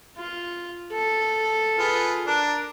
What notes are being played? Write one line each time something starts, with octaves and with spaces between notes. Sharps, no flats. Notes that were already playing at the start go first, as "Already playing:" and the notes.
F4
A4
F4 G#4 B4
D4 A#4